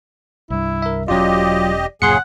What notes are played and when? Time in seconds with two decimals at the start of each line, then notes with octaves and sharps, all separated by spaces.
0.50 C2 G2 E4
0.82 A#4 E5
1.08 E1 F#3 C#4 F4 G4 D5 D#5
2.02 D1 F#2 A#2 C#3 G#4 F#5 C6 C#7